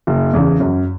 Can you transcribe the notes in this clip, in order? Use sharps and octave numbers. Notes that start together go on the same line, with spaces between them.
F#1
E2 C#3
F#2